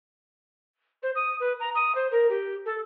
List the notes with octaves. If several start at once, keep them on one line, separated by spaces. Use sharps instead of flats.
C5
D#6
B4
A#5
D#6
C5
A#4
G4
A4